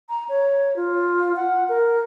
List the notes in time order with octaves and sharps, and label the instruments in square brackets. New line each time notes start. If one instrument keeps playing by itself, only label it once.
[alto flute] A#5
C#5
F4
F#5
A#4